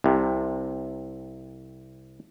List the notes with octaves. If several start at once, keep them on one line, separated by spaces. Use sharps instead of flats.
C2 C3